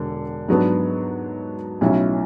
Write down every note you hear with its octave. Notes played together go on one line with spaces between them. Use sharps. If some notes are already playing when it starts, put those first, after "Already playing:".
Already playing: E1 D3
G#2 F#3 B3 D4
B1 A2 F#3 C#4 E4